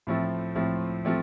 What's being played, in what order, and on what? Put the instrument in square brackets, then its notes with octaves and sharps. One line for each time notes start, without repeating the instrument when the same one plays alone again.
[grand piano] A2 F3 A3 C4
A2 F3 A3 C4
F3 A3 C4